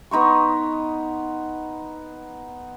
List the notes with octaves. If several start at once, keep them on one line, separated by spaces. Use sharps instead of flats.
B3 D#4 C6 C#6